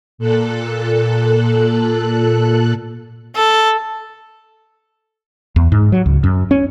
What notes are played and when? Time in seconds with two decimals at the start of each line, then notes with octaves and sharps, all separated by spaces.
0.18 A#2 A4 F#6
3.36 A4
5.56 E2
5.72 G#2
5.92 F#3
6.06 C#2
6.24 F#2
6.51 C#4